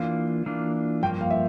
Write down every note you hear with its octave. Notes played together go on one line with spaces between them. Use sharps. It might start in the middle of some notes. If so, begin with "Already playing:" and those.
Already playing: E3 A#3 D4 F4 F5
E3 A#3 D4 F4
G2 F3 A#3 G5
F5
E5